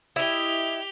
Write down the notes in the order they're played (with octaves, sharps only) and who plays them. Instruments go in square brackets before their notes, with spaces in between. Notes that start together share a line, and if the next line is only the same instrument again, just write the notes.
[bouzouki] E4 D#5 [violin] G4 F7